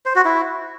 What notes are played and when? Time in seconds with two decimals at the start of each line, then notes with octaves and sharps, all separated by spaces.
0.06 C5
0.15 F#4
0.25 E4